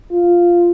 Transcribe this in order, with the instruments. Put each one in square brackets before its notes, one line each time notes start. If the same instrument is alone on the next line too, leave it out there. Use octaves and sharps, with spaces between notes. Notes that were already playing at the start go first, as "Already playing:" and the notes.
[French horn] F4